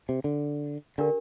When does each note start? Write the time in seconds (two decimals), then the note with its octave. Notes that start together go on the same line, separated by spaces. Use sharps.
0.09 C3
0.24 D3
0.98 D3 D4 G4 A#4